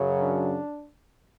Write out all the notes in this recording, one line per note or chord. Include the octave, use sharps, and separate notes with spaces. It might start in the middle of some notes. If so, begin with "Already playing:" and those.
Already playing: F#2 C#3 F#3
D4